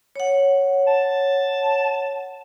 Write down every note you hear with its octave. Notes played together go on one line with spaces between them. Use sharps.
C#5 F#5
A5